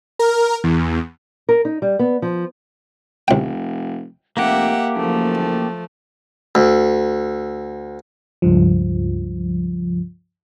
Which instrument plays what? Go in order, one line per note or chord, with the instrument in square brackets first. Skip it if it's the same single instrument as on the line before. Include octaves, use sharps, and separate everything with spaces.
[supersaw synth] A#4
E2
[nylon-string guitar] A#4
D#4
G3
B3
F3
[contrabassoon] F1 [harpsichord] C2 G5
[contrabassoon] F1 [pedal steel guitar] A#3 G4 [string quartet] E5 F#5
[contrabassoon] F#1 [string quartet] F3 A3
[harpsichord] D2
[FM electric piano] C#2 G2 F3